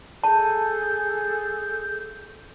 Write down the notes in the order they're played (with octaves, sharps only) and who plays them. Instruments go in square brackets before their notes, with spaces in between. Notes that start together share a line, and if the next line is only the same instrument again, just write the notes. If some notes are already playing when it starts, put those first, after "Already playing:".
[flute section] G#4 A4 G6 [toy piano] A5